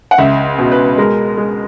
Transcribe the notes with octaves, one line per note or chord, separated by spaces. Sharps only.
F#5
C#2 E5
B2
B4
G#3 A#4
G#3